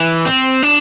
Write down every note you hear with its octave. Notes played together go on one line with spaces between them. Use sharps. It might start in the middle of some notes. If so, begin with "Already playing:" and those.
Already playing: E3
C4
D4